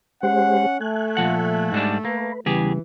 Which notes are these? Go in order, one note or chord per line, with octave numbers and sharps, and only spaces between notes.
G#3 C#4 G4 C5 F#5
A3 G#5 F#6
A#2 F3 F#5
G#2 G3 D4
A#3 B4
E2 C#3 E3 G3 G4 G#4